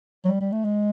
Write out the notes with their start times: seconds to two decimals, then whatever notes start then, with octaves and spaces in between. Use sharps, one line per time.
0.25 F#3
0.28 G3
0.41 G3
0.52 A3
0.65 G#3